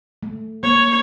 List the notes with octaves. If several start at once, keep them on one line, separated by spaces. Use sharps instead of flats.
A3
A#3 C#5